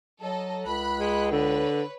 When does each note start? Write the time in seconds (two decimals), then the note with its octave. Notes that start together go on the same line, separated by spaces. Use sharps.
0.21 F#3 A4 D#5
0.66 C#2 B5 F#6
1.00 G#3
1.32 D3 B4 C#5